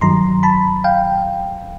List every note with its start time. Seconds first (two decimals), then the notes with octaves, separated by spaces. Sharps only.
0.01 G2 D#3 F#3 A#5 C6
0.43 A5 B5
0.84 F5 G5